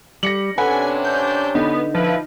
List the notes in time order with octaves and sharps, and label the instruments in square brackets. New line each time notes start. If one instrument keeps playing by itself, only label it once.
[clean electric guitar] G3 [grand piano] A#6 C#7 F#7
[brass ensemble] C3 C#4 D4 [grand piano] A4 F#5 [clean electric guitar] B4 [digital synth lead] G#5
[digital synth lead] G6
[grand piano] D3 [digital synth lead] B3 [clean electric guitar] D#4
[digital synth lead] F3 [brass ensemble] E4 B4